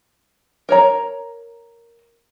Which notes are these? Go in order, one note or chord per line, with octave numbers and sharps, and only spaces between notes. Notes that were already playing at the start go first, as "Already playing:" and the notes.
A#4 C#5 A#5